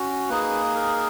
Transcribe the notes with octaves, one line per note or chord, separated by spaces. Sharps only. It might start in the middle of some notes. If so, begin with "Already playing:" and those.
Already playing: C#4 F#4
A#3 D#4 G#4 B4
A#4